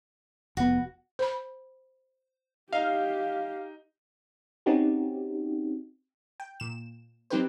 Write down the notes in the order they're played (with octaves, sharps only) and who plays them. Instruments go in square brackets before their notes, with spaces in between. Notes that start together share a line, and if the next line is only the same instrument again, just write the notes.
[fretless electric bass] F1 B3 [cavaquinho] F#4
[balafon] C5 B5
[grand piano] D#4 [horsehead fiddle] G4 [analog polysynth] F5
[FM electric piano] C4 C#4 D#4 F#4 G4
[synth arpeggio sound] G5
A#2 E7
F#3 C4 D#4 G4 B4 C5